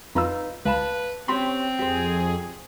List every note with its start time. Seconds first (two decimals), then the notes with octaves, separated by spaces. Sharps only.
0.15 F2 D#4 F4 B4 A#5 E6
0.66 C#2 B4 F5 A5 B5
1.28 C4 C#4 G4 B5 C6
1.79 F2 G4 G#4 C5